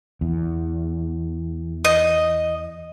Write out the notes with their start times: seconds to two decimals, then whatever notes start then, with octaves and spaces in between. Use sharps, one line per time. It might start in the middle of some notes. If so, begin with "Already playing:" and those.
0.21 E2
1.85 D#5